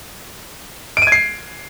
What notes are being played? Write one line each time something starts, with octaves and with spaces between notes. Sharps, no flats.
D7
D#7
G#6
C7